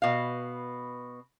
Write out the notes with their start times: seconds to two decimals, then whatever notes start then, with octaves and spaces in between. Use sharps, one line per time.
0.02 B2 F5